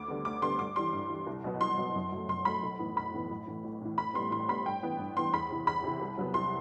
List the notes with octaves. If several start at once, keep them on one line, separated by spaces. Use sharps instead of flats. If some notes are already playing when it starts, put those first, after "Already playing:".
Already playing: D2 D6
D3 G3 B3
D2 D6
D3 G3 B3 C6
G2 D6
E3 G3 C6
G2
E3 G3
C2
B2 F#3 B3
C2 C6
B2 F#3 B3
F#2
F#3 A3
F#2 C6
F#3 A3 B5
B1
A2 E3 B3
B1 B5
A2 E3 B3
A1
A2 E3
A1
A2 E3
A1 B5
A2 G3 B3 C6
A1 C6
A2 G3 B3 B5
G2 G5
E3 B3
G2
E3 B3 C6
E2 B5
C3 E3
E2 B5
C3 E3
C2
C3 F#3 B3
C2 C6